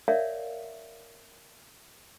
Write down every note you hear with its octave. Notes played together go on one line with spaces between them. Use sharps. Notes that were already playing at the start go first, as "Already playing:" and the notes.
A#4 C#5 D5 E5 F5